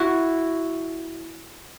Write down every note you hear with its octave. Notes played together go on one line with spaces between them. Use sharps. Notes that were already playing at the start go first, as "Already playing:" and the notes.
Already playing: E4 F#4